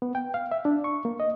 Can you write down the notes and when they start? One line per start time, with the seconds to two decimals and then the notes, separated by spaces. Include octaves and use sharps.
0.02 B3
0.15 G5
0.34 F5
0.52 E5
0.65 D4
0.84 C#6
1.05 A#3
1.20 D#5